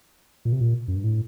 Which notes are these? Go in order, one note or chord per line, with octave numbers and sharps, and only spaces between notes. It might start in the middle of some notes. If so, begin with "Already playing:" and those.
A#2
C3
A#2
F#2
G2
A2